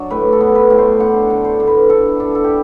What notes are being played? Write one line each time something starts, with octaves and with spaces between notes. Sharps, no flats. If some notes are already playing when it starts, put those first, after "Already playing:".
Already playing: F#3 D4 D5
A2 B4
A4
B3
B4
A2
C5
D4 F#5
D3
C5
D3
B4
D3 A4
D4
A4
G4